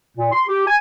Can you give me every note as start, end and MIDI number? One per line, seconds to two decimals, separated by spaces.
0.17 0.30 46
0.32 0.42 84
0.47 0.67 67
0.67 0.75 80